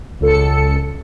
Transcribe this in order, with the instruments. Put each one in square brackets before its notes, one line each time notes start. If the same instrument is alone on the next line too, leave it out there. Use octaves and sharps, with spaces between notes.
[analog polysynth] C#2 A4 C#7